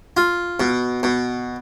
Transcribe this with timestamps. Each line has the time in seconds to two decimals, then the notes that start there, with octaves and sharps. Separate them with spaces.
0.17 F4
0.60 B2
1.03 B2